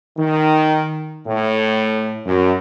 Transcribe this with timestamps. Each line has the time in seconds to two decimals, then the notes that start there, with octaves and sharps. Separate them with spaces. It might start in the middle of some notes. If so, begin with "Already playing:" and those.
0.17 D#3
1.26 A2
2.25 F#2